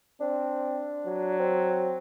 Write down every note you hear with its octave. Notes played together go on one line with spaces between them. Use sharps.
C4 D4
F#3
C4